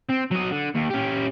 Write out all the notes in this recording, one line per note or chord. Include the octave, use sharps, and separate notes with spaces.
C4
F#3 D#5
D3
D#2
C#4 G4